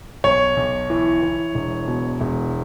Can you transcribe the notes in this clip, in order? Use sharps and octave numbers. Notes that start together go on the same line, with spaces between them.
B1 C#5
B1
E3
E3
E1
B2
E1